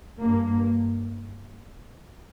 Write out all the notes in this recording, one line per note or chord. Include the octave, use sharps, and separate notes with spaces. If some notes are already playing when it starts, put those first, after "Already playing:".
G2 A#3